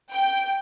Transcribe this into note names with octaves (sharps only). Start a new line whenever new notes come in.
G5